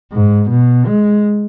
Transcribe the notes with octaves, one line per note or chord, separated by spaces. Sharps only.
G#2
B2
G#3